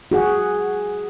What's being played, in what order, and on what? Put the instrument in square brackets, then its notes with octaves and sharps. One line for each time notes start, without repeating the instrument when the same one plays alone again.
[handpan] F#4 G#4 F#5